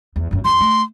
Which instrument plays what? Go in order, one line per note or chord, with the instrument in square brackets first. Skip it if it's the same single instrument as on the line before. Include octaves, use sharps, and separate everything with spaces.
[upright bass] E2
G1 F#2
[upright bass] F2 [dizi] C6
[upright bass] A3